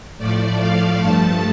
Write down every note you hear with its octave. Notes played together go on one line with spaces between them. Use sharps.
A2 F3 A3 D5
F5
G2 F3 A3 A5